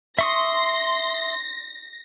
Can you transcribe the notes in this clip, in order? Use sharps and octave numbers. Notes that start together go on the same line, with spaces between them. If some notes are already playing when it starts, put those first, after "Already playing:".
E5 C6 C#6 D#6 A#6